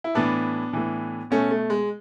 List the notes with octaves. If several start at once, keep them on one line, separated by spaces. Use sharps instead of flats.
E4
A2 E3 B3 D4
A2 E3
B2 A3 C#4
A3
G#3